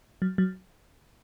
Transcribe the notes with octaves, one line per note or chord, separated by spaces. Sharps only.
F#3
F#3